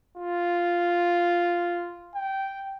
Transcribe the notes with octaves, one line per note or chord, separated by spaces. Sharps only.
F4
G5